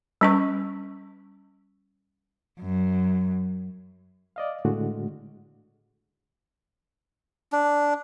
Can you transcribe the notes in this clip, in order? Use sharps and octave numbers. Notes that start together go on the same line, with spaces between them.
G3 C#4 C#6
F#2
D5 D#5 F5
A2 D3 G#3 F#4
D4